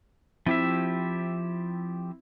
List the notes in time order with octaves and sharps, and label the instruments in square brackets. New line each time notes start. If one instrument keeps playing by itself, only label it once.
[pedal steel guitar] F3 G4 E5 [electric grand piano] C4 E4